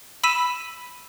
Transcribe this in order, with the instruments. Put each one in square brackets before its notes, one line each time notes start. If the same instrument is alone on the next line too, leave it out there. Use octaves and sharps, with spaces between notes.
[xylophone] B5 E6 B6 D#7 E7